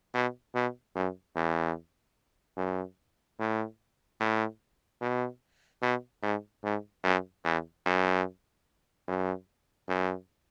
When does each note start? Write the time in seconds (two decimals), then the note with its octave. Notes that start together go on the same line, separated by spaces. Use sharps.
0.14 B2
0.55 B2
0.96 F#2
1.36 E2
2.57 F#2
3.39 A2
4.20 A2
5.01 B2
5.82 B2
6.23 G#2
6.63 G#2
7.04 F#2
7.45 E2
7.86 F#2
9.08 F#2
9.89 F#2